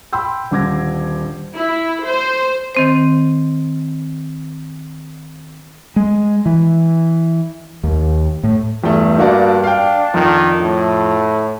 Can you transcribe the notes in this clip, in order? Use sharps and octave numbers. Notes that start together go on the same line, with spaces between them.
G5 B5 C6 E6 G6
D#1 D3 D6 G#6 A#6
E4
C5
D#3 C4 C5
G#3
E3
D#2
A2
E2 G2 A3
A#3 D4 F#4 D5
F5 G5
F2 D#3
A2